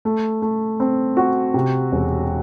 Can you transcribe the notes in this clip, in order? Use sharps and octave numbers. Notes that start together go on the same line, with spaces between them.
A3
A3
C4
F#4
C3
E1